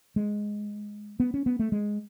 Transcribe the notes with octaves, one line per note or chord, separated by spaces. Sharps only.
G#3
B3
C#4
B3
A3
G#3